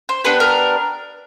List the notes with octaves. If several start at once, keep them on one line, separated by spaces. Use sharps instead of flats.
C5
B3 D4 G4 B4
A#4